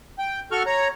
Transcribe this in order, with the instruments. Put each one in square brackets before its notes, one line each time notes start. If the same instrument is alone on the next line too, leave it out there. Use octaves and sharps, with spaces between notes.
[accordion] G5
F#4 A4 C#6 F6
C#5 A#5